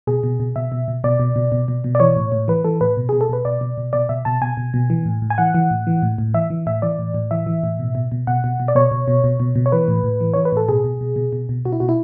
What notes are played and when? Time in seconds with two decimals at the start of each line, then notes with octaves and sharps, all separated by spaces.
0.07 B2 G#4
0.23 B2
0.40 B2
0.56 B2 E5
0.72 B2
0.88 B2
1.04 B2 D5
1.20 B2
1.36 B2
1.52 B2
1.68 B2
1.84 B2
1.95 D5
2.00 E3 C#5
2.16 A2
2.32 A2
2.48 E3 B4
2.64 E3 A4
2.81 A2 B4
2.97 B2
3.09 G#4
3.13 B2
3.21 A4
3.29 B2 B4
3.45 B2 D5
3.61 B2
3.77 B2
3.93 B2 D5
4.09 B2 E5
4.25 B2 A5
4.42 B2 G#5
4.57 B2
4.74 B2
4.90 E3
5.06 A2
5.22 A2
5.30 G#5
5.38 E3 F#5
5.54 E3
5.71 A2
5.87 E3
6.02 A2
6.18 A2
6.34 E3 E5
6.50 E3
6.66 A2 E5
6.82 E3 D5
6.99 A2
7.14 A2
7.31 E3 E5
7.47 E3
7.63 A2
7.79 B2
7.95 B2
8.12 B2
8.27 B2 F#5
8.44 B2
8.60 B2
8.68 D5
8.75 B2 C#5
8.91 B2
9.08 B2
9.24 B2
9.40 B2
9.55 B2
9.66 C#5
9.72 E3 B4
9.88 A2
10.04 A2
10.21 E3
10.34 E3 C#5
10.45 B4
10.52 A2 A4
10.68 B2 G#4
10.84 B2
11.01 B2
11.16 B2
11.33 B2
11.49 B2
11.65 B2 F#4
11.72 E4
11.80 B2 F#4
11.89 E4